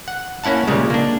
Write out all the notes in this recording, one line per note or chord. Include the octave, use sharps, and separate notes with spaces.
F#5
A#3 C#4 E4 F#5 A5
A#2 C#3 G3 G#3
A#3 D4